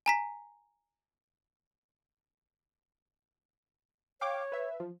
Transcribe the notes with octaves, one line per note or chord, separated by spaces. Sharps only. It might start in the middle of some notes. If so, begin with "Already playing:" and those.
G#5 A#5 B6
C#5 F5 G5 D6
B4 E5
F3